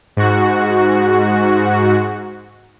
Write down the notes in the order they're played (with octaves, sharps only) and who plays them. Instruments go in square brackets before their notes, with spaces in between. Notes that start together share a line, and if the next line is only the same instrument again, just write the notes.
[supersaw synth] G#2 F#4